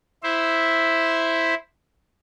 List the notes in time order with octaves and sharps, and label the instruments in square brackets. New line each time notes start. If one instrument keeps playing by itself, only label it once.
[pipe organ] E4 C5 E5